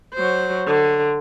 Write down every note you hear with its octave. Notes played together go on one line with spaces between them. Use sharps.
F#3 C5
D3